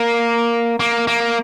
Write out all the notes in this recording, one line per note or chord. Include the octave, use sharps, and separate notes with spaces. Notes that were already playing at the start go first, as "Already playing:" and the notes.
Already playing: A#3
A#3
A#3